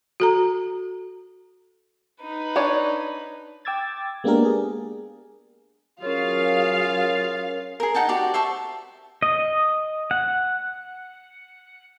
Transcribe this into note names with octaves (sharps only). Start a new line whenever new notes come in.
F#4 A4 A#5
D#4 B4
D4 C#5 D5
G5 D6 E6 G#6 A6
G#3 A#3 B3 D4 G4 A#4
G#4
F#3 C#4 F4 G#4 A#4 C#5 F5
G#4 A#4
D#4 F#5 G5 A5
F#4 G4 D5
C5 E5 A5 C#6
D#5
F#5